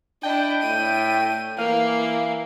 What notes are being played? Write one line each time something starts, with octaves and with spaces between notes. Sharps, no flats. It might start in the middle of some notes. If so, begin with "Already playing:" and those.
D4 E4 D#5 G5
A2 D#7
E3 A#3 F5